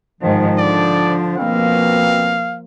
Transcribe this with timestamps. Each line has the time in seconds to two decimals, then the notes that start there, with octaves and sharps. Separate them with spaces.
0.21 G#2 D#3 F3
0.58 D3 D5
1.38 B2 F3 A#3 C4 F5